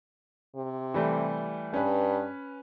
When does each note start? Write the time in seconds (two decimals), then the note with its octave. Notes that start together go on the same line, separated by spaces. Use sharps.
0.56 C3
0.94 E3 G3 A3
1.74 G2 C#4 B4